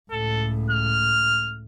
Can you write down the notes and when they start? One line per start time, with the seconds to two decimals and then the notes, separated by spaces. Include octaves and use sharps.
0.11 C#2 A2 A4
0.70 F6